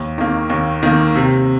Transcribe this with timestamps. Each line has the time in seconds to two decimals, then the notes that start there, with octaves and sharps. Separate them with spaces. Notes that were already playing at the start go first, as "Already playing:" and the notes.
Already playing: D#2
0.18 D#3 A#3
0.50 D#2
0.83 D#3 A#3
1.15 C3